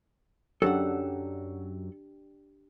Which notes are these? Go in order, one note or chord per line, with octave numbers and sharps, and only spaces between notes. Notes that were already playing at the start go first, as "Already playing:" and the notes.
F#2 F#3 D4 G4 A4 F#5